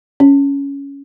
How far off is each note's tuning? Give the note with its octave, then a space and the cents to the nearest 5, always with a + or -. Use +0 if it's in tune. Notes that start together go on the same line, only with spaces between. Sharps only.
C#4 +10